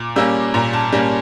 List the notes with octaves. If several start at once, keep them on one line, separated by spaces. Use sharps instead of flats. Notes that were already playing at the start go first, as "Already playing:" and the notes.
Already playing: A#2 D6
G3 A#3 C#4 E6
A#2 A#5
A5
G3 A#3 C#4